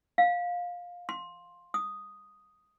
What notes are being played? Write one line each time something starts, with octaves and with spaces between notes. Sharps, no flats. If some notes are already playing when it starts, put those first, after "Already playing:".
F5
C6
D#6